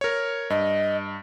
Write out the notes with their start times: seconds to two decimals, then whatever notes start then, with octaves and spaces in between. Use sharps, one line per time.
0.01 A#4 C#5
0.50 G2 D#5